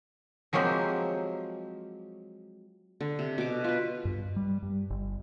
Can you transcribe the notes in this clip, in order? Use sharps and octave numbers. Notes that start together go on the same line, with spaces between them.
F3 F#3 G#3 A#3 C4 G4
D3
C3
B2 D6
F4 B4
G2
G3
G2
G1